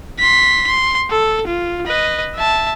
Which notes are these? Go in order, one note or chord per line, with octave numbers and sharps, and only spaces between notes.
C6 B6
C6
A4
F4
B4 D#5
E5 A5